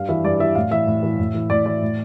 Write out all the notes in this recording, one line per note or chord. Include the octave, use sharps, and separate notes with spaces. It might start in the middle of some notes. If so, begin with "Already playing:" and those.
Already playing: G2 F5
E3 E5
G2 D5
E3 E5
A2 F5
E3 E5
A2
E3
A2
E3
A2 D5
E3 D5
A2